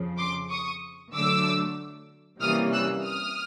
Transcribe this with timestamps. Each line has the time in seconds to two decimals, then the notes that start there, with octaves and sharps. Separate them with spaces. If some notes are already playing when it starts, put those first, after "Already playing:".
Already playing: F2 C#3 F3
0.18 C6 D6
0.50 C#6 D#6
1.14 D3 F#3 A3 D6 E6
2.41 C3 E3 G3 A#3 C#4 D#6 F6
2.73 E6 F#6
3.05 D#6 F6